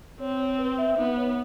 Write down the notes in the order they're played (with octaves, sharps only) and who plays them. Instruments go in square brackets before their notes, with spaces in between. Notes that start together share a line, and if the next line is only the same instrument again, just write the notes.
[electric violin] C4 [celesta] C#5
[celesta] C#5
B4
E5
[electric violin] B3 [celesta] D#4
[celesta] C#5